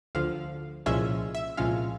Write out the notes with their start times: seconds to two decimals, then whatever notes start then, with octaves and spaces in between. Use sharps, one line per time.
0.15 D2 D3 F3 F5
0.86 C2 A#2 F3 G#3 C#4 E5
1.35 E5
1.57 C2 A#2 F3 G#3 C#4 F5